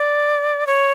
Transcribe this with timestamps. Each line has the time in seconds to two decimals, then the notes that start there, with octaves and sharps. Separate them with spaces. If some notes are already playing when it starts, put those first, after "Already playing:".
Already playing: D5
0.67 C#5